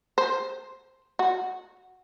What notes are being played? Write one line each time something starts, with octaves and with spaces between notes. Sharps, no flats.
C5
F#4